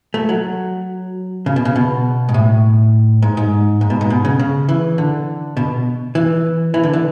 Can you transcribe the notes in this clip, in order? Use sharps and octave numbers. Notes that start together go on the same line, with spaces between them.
A3
F#3
C#3
B2
C#3
B2
G#2
A2
G#2
G#2
G#2
B2
G#2
B2
C#3
C#3
E3
D3
B2
E3
E3
D3
E3